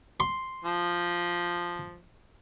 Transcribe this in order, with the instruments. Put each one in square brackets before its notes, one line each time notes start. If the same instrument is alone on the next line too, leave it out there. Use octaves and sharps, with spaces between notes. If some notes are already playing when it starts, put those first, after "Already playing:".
[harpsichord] C6
[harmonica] F3